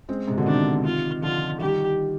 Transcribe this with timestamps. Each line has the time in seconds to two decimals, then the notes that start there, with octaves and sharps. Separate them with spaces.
0.09 G#3 C4
0.28 G#2 C3
0.38 B2 D3
0.46 C3 D#3 D4
0.85 F4
1.23 D3 F3 F4
1.60 D#3 G3 G4